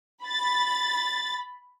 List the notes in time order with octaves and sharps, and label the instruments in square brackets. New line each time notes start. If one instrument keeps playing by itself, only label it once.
[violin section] B5 A6